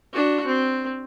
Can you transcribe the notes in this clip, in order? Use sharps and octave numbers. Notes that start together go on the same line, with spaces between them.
D4 F#4
C4